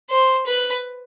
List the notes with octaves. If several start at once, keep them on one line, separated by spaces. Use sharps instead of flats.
C5
B4